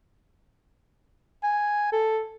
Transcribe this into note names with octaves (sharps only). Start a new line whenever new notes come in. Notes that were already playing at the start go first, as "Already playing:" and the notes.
G#5
A4